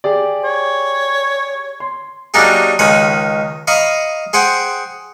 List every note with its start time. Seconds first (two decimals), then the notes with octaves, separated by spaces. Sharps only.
0.04 G4 G#4 D5
0.44 C#5
1.80 C6
2.34 F#3 G3 A#3 D4 D#4 G#4
2.79 C#2 D#3 C#5 B5 D#6
3.67 D#5 F5 A#5 B5 C#6
4.33 G#4 C5 F#5 G5